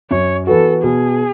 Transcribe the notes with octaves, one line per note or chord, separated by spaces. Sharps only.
F#2 C#5
E3 B3 F#4 A4
B2 G#4